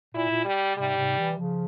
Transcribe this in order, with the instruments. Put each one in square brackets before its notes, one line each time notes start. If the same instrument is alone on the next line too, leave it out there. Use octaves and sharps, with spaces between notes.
[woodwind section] A#2 [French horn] E4
[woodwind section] A#2
[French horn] G3
[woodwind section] G#2 C3 [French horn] G3
[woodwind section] G#2 C3
C3 E3
C#3 F3